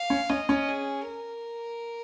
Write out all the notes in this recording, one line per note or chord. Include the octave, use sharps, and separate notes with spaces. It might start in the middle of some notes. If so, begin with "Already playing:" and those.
Already playing: F5
C#4
C#4 D#5
C#4
G#4
A#4